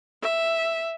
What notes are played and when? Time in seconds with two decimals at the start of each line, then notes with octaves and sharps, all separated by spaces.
0.22 E5